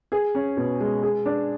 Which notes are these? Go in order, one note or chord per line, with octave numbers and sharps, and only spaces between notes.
G#4
C#4
B2
G#3
G#4
D4